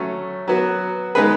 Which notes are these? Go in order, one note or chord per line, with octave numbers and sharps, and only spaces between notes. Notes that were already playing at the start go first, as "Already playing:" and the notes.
Already playing: F#3 A3 C#4
F#3 B3 F#4
G#3 B3 D#4 G#4 B4